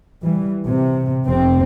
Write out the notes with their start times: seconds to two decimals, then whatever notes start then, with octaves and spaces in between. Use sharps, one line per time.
0.22 E3 G3
0.67 C3
1.25 F1 C3 C4